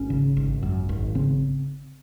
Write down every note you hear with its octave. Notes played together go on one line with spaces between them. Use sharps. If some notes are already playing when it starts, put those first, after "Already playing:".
Already playing: G#1 C#4
C#3
G#1
F#2
G#1
C#3 C4